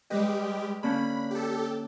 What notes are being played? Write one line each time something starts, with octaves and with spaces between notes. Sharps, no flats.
G3 G#3 G4 B4 D#5
D3 A#3 C#4 B5
G4 A4